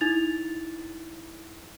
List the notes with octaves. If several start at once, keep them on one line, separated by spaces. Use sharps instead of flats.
D#4 E4 A6 F7